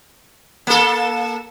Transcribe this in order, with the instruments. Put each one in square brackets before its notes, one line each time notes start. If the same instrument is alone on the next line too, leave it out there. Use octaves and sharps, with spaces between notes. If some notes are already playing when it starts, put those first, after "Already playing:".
[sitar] A#3 A4